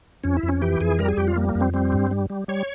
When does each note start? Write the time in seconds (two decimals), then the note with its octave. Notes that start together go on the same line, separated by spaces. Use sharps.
0.24 F2 C#4
0.37 E4
0.43 F2
0.49 C#4
0.62 E3 G4
0.80 F2 G#4
0.99 G3 A#4
1.08 G#4
1.17 F2 G4
1.28 F4
1.36 G3 A#3
1.49 A#3
1.55 F2
1.61 C4
1.74 G3 C4
1.92 G2
2.11 G3
2.30 G3
2.48 G3 C#5